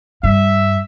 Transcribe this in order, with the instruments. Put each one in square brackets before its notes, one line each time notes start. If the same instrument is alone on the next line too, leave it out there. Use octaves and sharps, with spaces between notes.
[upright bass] G2 [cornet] E5